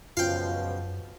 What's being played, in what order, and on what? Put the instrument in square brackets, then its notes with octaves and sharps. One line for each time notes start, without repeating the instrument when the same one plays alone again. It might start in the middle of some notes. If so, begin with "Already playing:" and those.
[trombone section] C#2 B2 F3 [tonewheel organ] F#2 [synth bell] F4 [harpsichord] F5 G5